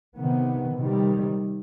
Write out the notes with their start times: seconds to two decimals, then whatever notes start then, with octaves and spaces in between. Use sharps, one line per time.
0.16 C3 D#3 B3
0.75 C3 D#3 G3